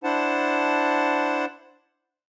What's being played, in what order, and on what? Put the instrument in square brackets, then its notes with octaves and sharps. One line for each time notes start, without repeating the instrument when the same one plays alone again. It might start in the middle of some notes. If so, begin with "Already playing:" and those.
[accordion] D4 E4 C5 F#5 A5